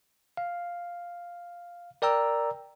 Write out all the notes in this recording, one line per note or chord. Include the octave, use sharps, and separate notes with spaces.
F5
A#4 D5 G5 A#5 E6